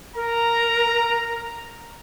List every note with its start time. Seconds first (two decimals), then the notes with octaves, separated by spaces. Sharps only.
0.15 A#4 A#5